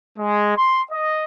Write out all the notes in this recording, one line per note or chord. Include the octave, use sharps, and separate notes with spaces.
G#3
C6
D#5